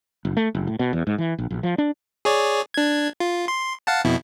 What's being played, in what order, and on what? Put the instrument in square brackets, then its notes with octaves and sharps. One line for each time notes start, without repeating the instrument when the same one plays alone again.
[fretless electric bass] F#1
A3
F#1
A2
B2
E2
G#2
E3
A#1
A#1
F3
D4
[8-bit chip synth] G#4 C#5 D5
D4 G#6
F4
C6
F5 F#5 A5
F2 B2 E4